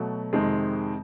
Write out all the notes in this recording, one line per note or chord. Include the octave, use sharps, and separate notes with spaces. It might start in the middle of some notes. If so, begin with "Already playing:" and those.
Already playing: B2 F#3 A3
F2 C3 D#3 G#3 C4